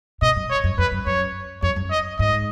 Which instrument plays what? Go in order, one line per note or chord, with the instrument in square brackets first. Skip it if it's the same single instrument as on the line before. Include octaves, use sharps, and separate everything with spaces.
[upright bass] B2 [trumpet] D#5
[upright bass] F#2
[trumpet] C#5
[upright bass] F#2
[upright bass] F2 [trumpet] B4
[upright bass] F#2
[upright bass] F#2 [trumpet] C#5
[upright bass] F2 [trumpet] C#5
[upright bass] F#2
[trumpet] D#5
[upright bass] G#2 [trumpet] D#5